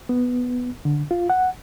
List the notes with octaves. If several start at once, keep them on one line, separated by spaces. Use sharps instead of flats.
B3
D3
F4
F#5